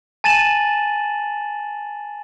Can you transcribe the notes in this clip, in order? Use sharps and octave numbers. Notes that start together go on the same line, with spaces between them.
G#5 A5 A6 D#7 E7 F#7